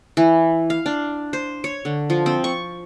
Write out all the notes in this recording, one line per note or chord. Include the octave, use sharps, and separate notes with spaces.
E3
F5
D4
C5
C#5
D3
F3
C4
C#6